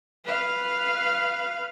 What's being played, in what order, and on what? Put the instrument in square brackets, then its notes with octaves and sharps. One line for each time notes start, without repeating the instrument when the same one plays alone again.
[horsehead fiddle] B4 F5